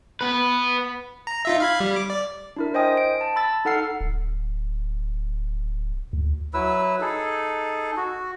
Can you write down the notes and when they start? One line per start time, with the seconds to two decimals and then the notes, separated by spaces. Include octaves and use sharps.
0.21 B3 B4
1.27 A#5
1.45 D#4 F4 E5
1.60 F5 B5 G#6
1.80 G3
1.96 D6
2.10 D5
2.56 D4 E4 A#4
2.74 C5 D#5 G5 G#5 D#6
2.97 D7
3.21 A5
3.36 B5 E6 A6
3.65 D#4 A4 F#5 F6 C7
4.01 D1
6.13 D2
6.54 F#3 E4 B4 E6
7.01 D#4 G#4 A4
7.97 F#4